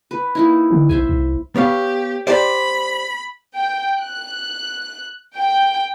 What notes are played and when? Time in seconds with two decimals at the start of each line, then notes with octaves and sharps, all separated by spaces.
0.11 B4
0.35 A#3 D#4 E4
0.71 D3
0.89 B1 C5 E5 G#5
1.09 C2
1.56 B3 G4 C#5 F5
2.27 G4 C5 D5 B5
3.55 G5
4.01 F#6
5.36 G5